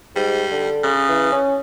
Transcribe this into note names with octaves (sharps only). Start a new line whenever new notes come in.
G#2 G3
D3
C#3
E3
C#4